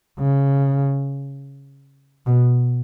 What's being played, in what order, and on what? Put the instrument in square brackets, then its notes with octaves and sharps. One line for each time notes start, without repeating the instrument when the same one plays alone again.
[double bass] C#3
B2